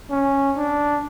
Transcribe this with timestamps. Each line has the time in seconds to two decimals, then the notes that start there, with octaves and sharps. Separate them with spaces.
0.11 C#4
0.57 D4